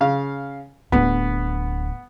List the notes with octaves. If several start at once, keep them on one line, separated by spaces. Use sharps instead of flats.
C#3 F5
D1 B3 D4